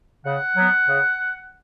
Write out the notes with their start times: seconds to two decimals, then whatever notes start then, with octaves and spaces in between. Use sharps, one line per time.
0.25 C#3 F#5
0.56 F#3 B3
0.87 C#3